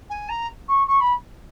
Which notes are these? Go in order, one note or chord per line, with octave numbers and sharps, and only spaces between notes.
G#5
A#5
C#6
C#6
B5